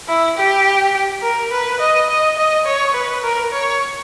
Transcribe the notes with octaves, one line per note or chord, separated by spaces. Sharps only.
E4
G4
A#4
B4
D#5
D#5
D#5
C#5
B4
A#4
C#5